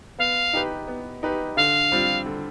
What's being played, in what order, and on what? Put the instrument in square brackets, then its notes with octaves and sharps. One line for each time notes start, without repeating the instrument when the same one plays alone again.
[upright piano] B3 [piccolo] F5
[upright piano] D#4 G4 B4
B3
D#4 G4 B4
[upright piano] D3 [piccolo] F5
[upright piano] G3 C4 F4
D3